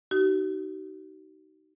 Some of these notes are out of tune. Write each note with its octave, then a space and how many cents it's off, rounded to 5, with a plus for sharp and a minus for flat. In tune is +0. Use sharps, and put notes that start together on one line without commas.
D#4 +0 F#4 +45